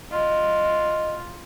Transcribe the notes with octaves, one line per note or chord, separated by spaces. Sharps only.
F4 D#5